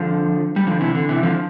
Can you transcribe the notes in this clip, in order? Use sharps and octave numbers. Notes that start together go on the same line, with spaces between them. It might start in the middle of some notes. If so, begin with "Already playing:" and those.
Already playing: D3 F3
G3
D3 F3
C3 E3
D3
C3 E3
D3 F3